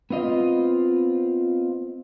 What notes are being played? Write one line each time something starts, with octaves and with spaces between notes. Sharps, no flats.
B3 C4 F4 D#5